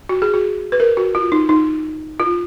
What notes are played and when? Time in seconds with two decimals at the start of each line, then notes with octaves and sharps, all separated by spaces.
0.09 F#4
0.22 G#4
0.34 F#4
0.72 B4
0.80 A#4
0.97 F#4
1.15 F4
1.32 D#4
1.49 D#4
2.20 F4